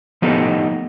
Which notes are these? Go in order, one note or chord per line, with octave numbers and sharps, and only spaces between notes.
F3 A3 B3 D#4 G4 A4